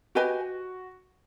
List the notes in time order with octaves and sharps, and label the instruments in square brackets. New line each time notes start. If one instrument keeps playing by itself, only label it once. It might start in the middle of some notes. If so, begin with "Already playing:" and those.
[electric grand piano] F#4 [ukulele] G4 B4 D#5 G#5